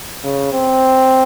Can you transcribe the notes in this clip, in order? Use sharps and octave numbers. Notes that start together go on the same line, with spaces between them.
C#3
C4